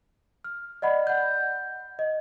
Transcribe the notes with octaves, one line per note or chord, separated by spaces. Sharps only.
F6
D5 D#5 F#5 B5
F#5 G6
D#5